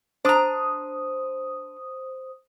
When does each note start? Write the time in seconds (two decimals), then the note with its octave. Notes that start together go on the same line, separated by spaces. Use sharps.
0.25 D4 C5 A#5 D#6